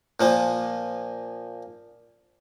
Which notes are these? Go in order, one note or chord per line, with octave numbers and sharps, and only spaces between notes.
A#2 F3 A#3